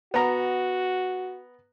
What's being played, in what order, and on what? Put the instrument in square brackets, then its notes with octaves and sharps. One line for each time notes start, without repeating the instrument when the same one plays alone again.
[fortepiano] B3 A#5 [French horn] F#4